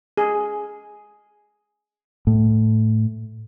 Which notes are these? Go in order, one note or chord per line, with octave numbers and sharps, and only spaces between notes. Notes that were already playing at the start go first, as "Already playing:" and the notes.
G#4
A2